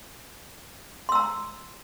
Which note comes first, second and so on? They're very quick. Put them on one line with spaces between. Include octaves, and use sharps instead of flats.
C6 E6 A#5